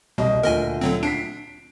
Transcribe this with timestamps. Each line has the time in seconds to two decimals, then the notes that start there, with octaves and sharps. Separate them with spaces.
0.18 C2 B2 D#5
0.43 D2 A#2 A#4 D#5 G#5
0.81 D3 F#3 C4
1.03 D4 B6 C7 D7